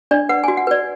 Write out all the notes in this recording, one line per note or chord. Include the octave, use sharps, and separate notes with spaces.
D4 D5
B4 F#5
F#4 G#5
F#5
B4 D5